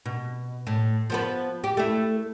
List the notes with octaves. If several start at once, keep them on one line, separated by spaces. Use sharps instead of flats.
B2
A2
F3 B3 B4
G4
A3 E4